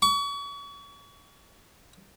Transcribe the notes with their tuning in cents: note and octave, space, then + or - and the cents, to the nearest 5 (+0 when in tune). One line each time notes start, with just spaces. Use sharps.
C#6 +35